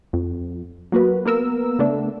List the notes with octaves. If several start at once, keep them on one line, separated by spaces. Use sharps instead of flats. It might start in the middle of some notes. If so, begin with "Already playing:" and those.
F2
F#3 A#3 F#4 B4
A#3 B3 A#4 E6
C#3 A3 B3 D4